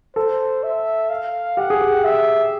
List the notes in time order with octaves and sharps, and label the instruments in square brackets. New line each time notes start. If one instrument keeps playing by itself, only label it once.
[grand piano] A4 [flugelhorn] C5
[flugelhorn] E5
F5
[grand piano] G4 [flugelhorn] F#5
[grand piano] G#4
G4
[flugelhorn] E5